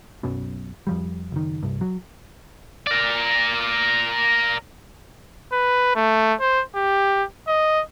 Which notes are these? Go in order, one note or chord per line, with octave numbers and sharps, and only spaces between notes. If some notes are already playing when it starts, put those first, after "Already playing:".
B1 F#2 B2
F2 F3 G3
F#1 D#3
C2 G2
F#3
A#4 D5
B4
A3
C5
G4
D#5